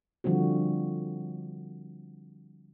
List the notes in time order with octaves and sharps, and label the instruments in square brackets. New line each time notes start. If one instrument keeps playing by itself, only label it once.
[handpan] D3 F3 G3 C4 F#4